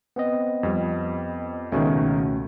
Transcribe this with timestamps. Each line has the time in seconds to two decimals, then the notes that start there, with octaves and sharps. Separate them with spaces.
0.16 B3 C4 D#5
0.63 F2 G3
1.72 C#2 B2 D#3 A3 C#4 F#4